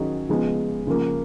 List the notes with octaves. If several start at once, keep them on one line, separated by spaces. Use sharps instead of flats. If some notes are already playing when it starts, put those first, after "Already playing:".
Already playing: D#3 F#3 C#4 G#4
C#3 F3 G#3 B3
C#3 F3 A#3